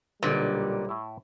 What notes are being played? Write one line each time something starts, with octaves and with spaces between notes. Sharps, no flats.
B1 A#2 D3 G3
A2 E4